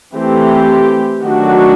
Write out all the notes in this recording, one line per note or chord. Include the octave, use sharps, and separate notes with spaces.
E3 A3 C4 G4
D#3 F#3 A3 D4 F#4